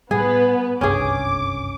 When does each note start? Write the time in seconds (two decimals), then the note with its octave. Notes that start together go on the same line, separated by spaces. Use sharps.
0.11 A2 G3 B3 G#4 B4
0.81 F#1 C2 G2 C#4 G#4 D6